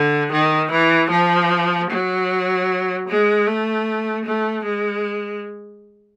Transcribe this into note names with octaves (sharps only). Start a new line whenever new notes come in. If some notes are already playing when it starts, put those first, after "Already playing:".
Already playing: D3
D#3
E3
F3
F#3
G#3
A3
A3
G#3